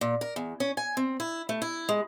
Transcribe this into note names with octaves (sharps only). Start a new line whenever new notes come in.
A#2
A#4
E2
C#4
G#5
C4
E4
A3
E4
G#3